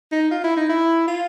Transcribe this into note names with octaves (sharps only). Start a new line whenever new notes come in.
D#4
F4
E4
D#4
E4
F4